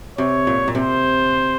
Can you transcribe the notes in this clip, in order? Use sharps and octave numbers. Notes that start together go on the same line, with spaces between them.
C3 C#5
A#2
A#2
C3 C5